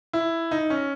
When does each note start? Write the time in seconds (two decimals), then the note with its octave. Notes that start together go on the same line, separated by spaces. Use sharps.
0.13 E4
0.51 D#4
0.70 C#4